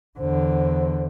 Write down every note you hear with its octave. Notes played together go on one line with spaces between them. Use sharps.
E2 D3 C5